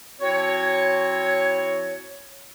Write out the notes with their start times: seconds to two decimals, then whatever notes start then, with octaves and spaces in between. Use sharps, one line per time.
0.21 F3 C4 E4 F#4 C#5